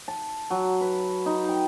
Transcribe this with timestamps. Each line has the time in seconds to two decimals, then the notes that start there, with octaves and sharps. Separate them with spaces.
0.08 A5
0.50 F#3
0.81 B4
1.26 D#4
1.49 G5